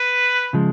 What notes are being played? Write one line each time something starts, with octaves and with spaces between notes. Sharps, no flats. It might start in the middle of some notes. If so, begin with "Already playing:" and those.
Already playing: B4
C#3 F3 G#3